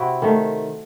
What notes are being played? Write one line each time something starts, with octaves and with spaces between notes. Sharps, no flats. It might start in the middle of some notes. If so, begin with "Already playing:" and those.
Already playing: C3 C4 E4 F#4
D#3 A3